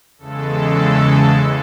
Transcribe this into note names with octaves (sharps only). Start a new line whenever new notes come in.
E2 C#3 E3 G#3 A4